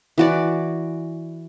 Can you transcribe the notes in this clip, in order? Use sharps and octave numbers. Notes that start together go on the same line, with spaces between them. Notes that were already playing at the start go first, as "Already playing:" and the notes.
E3 F#4 D5